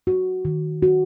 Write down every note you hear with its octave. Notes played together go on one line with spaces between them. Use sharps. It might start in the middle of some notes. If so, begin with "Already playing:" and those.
F#4
D#3
F#4